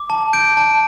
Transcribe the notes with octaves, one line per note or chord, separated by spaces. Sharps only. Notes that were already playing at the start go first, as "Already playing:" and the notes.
Already playing: D6
A5
G6 D7
A5